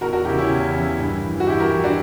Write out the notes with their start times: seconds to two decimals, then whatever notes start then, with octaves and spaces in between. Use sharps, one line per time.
0.01 E2 F#4 A#4
0.13 F#4 A#4
0.25 C#3 E3 E4 G4
0.38 C#4 E4
0.50 E2
0.75 C#3 E3
0.98 G2
1.24 E3
1.40 F#4
1.47 G2 E4 G4
1.60 F#4 A#4
1.73 E3
1.84 D4 F#4